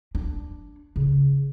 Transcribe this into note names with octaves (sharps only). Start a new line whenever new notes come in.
D4
C#3